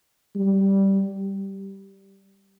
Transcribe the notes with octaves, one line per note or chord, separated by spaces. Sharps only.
G3